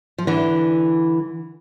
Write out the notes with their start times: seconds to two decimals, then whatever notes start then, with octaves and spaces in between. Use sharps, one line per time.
0.18 F3
0.27 D3 E3